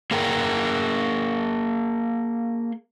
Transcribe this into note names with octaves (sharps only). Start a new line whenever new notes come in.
A#3 G#4 A#4 G5